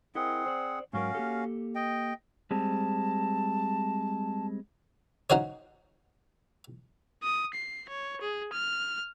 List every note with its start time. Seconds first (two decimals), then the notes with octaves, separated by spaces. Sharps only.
0.15 C4 E4 G#4 A#4 D#5 F#5
0.46 C5 D5
0.93 G#2 F#3 C#4 F#4 A#4 F5
1.15 A#3 G4 A4
1.75 D#5 G5
2.51 G3 G#3 C4 A5
5.30 C#4 D#4 F#4 C5 C#5
7.23 D#6
7.54 C7
7.89 C#5
8.21 G#4
8.53 F6